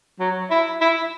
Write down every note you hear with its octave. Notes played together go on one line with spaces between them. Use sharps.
F#3
E4
E4